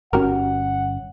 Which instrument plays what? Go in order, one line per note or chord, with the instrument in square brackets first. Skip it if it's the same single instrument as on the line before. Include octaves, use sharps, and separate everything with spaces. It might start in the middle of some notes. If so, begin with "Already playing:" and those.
[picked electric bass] G1 C4 C#4 [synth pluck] F#4 G4 A#4 [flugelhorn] F#5